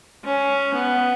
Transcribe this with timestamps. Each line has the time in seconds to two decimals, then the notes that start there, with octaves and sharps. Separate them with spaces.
0.25 C#4
0.75 B3